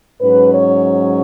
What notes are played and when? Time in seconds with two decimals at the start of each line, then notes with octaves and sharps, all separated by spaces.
0.21 G#2 F#3 C#4 B4
0.55 C#5